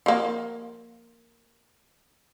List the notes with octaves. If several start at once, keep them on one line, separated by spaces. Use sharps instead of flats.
F3 A#3